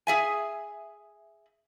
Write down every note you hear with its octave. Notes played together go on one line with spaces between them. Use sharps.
G#4 E5 G#5